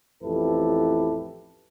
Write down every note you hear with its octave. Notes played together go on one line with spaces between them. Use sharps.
A1 F2 E4 G4 A4 B4